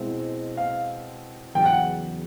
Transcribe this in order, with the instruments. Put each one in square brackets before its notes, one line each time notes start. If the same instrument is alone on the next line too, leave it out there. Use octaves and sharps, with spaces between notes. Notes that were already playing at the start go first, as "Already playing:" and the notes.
Already playing: [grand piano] B2 G#3 C4 E4
[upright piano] F5
[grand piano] E2 C#3 F#3 B3 [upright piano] G5
[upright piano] F#5